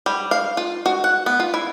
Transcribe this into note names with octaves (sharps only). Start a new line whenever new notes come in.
G3
F5
F4
F#4
F#5
B3
F4
E4